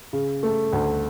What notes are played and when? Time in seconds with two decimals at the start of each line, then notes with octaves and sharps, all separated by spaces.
0.13 C#3
0.43 A3
0.72 D2